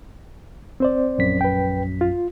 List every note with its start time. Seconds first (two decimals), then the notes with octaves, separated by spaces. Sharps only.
0.80 C4 C5 D5
1.18 A#1 F#2 B6
1.41 B4 G5
2.01 F4